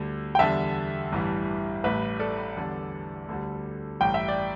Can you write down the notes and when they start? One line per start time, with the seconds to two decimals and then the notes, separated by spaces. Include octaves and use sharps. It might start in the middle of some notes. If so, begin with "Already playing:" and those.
Already playing: D2 D3 G3
0.35 G5
0.39 E2 D3 G3 E5 A5
1.12 A1 G2 E3 G3
1.84 A1 A2 G3 B4 E5
2.20 A4 D5
2.57 E2 D3 G3
3.28 D2 D3 G3
4.00 A1 G2 G3 G5
4.14 E5
4.28 D5